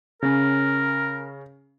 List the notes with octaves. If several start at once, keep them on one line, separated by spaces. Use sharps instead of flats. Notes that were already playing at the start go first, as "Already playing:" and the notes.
C#3 C#4 A#4